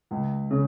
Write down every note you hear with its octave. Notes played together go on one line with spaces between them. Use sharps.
C#2
C#3